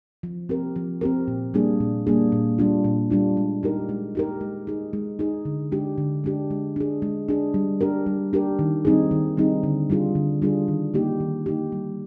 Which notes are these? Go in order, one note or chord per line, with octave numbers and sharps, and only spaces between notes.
F3
C4 G4 A#4
F3
C4 G4 A#4
A#2
G3 A#3 D4 G#4
A#2
G3 A#3 D4 G#4
A#2
G3 D4 F4
A#2
G3 D4 F4
G#3
D#4 G4 A#4
G#3
D#4 G4 A#4
G#3
D#4 G#4
G#3
D#4 G#4
D3
G#3 D4 G4
D3
G#3 D4 G4
G#3
D4 G#4
G#3
D4 G#4
G3
D4 G4 A#4
G3
D4 G4 A#4
D#3
G3 C4 D#4 G#4
D#3
G3 C4 D#4 G#4
D3
G3 D4 F4 G#4
D3
G3 D4 F4 G#4
D#3
A#3 D#4 G4
D#3
A#3 D#4 G4
G3